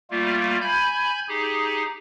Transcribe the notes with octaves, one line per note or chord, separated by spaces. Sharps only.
G3 A3 A#3 F4
G#5 B5 G6 G#6
D#4 G4 G#4